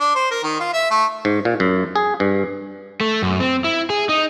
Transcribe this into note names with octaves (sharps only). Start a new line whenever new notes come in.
D4
C5
A#4
D#3
F4
E5
A3
G#2
A#2
F#2
G#4
G2
A3
F#2
C4
E4
G#4
D#4